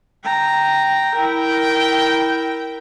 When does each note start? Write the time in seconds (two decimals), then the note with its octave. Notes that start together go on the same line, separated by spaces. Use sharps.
0.24 G5 A#5
1.15 E4 A#4 G5